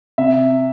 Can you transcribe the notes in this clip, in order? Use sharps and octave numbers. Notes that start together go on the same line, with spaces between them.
C3 E5